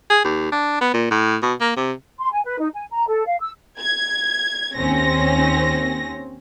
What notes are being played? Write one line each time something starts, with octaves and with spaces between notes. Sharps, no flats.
G#4
D#2
D4
B3
A#2
A2
B2
A#3
C3
C6
G#5
B4
D#4
G#5
A#5
A4
F5
E6
G#6
D#2 C4 C#4 A#6